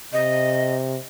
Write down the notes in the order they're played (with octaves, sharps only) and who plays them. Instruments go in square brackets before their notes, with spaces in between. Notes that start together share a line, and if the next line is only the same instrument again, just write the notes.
[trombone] C3 [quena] D#5